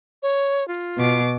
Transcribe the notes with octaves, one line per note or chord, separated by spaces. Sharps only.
C#5
F4
B2 D6